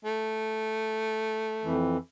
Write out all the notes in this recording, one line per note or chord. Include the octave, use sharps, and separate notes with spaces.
A3
F2 E3